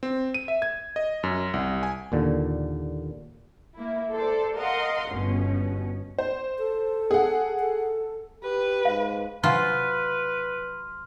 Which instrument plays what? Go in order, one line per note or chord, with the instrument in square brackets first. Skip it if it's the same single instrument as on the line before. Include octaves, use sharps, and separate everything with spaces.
[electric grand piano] C4
D#7
E5
G#6
D#5
F#2
C2
G#5
[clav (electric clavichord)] D#2 A#2 D3
[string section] A#3 E4
A4 C5 D5
A#4 D#5 F5 F#5 C6
G1 B2 C#4
[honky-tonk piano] C5
[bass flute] A4
[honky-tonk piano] G#4 F#5
[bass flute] A4
[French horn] G4 [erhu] B4
[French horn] G#2 [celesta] F5
[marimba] C3 G#5 [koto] F#3 F4 [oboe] B4 [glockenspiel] C6 F6